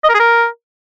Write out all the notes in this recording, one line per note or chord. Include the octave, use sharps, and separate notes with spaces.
D#5
A#4
G#4
A#4